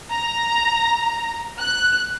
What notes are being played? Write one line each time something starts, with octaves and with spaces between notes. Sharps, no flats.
A#5
F#6